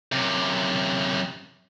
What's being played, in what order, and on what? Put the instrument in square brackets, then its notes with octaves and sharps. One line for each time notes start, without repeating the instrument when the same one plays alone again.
[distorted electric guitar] F#2 C3